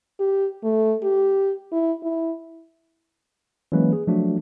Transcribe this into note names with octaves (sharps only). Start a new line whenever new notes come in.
G4
A3
G4
E4
E4
E3 F#3 G#3 A#3 C#4 B4
G#4
F3 F#3 A3 D4 F#4